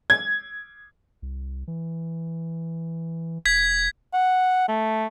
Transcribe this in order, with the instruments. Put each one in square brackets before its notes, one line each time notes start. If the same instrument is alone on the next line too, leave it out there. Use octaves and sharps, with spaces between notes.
[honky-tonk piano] G#6
[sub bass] C2
E3
[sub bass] F1 [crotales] G#6 B6
[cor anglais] F#5
A3